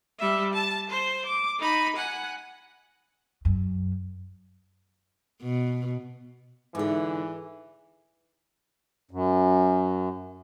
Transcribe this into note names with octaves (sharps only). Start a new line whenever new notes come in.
G3 E5
A5
C5
D6
D#4 B5
F#5 G#5
F#2
B2
G#2 D3 E3 G#4 E5 D6
F#2